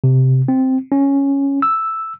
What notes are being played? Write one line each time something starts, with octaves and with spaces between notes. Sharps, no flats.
C3
C4
C#4
E6